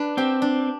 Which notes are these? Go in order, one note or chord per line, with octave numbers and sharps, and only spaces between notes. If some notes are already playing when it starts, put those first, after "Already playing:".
Already playing: D4 B4
C4 G4
D4